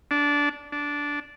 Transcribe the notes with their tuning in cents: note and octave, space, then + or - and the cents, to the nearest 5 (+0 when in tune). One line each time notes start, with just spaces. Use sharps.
D4 -15
D4 -10